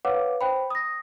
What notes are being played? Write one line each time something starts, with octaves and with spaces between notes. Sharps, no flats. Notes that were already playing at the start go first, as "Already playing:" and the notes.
B4 C#5 F5 F#5 D6
C5 G5 B5
D#6 A#6